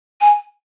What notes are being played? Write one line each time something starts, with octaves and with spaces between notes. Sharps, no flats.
G#5